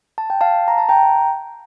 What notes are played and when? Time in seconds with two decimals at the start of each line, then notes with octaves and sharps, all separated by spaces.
0.18 A5
0.30 G5
0.41 F5 A5
0.68 A#5
0.78 A5
0.89 G5 A#5